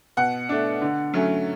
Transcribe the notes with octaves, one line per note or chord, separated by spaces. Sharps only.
B2 F#5
A3 D4
D3
F#3 A3 C#4